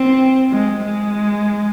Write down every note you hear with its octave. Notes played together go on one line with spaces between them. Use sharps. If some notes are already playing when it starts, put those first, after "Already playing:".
Already playing: C4
G#3
G#3